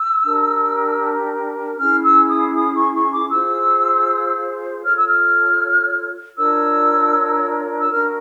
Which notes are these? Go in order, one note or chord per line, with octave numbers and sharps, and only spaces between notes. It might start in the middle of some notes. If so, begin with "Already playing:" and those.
Already playing: E6
D4 G4 A#4
C#4 E4 G#4 F6
E6
D#6
D#6
C#6
C#6
D6
F4 G#4 C5 E6
F4 A4 C#5 F6
E6
F6
D4 F4 A#4 C#5 E6
E6
D4 F#4 A#4 F6